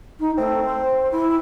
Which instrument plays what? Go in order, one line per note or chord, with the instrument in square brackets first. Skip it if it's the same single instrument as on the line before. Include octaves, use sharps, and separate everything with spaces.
[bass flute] D#4
[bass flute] A3 [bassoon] C4
[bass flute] C5
E4